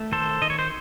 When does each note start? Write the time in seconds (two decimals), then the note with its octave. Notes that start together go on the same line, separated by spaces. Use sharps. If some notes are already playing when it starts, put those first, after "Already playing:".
Already playing: A3
0.12 D#3 A4 C5
0.42 D#3 D#5
0.50 C#5
0.59 C5